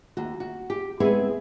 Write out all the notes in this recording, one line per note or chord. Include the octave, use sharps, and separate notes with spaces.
D#2 F#4
F#4
G4
G#3 B3 C4 E4 G#4 B4